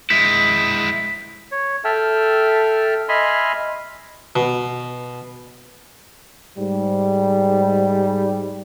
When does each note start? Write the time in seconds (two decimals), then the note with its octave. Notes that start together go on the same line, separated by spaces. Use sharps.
0.10 G#3 E4 B6
1.52 C#5
1.85 A4 E5 G5 A5 F6
3.09 D#5 E5 G#5 B5 C6 F6
4.36 B2
6.58 G#2 G3